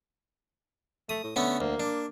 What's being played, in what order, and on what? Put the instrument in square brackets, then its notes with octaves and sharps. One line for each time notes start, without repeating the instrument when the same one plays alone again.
[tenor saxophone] A3 [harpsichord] D#6
[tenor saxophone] A2
[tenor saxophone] D3 [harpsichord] A3 B3 C#4
[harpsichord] D2 [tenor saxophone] A#3
[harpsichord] D4